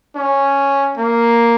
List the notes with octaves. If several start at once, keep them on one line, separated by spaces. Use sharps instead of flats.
C#4
A#3